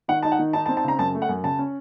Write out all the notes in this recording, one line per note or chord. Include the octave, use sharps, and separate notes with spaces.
D#3 F#5
D#4 A5
F#5
D#3
D#4 A5
A5
C4
A5
C#3 A#5
F#2 A5
A3
F#5
F#2
C#3 A5
C#4